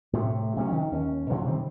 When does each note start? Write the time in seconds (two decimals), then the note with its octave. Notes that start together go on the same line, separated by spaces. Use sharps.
0.13 A2 C3 A3
0.56 C3 F#3 G#3 C#4
0.72 D#3
0.91 D#2 C#4
1.30 B2 D3 F3 F#3
1.44 C3 D#3 G3 C4